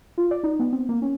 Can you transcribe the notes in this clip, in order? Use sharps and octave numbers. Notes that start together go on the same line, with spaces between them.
F4
D5
D#4
B3
C4
A#3
C#4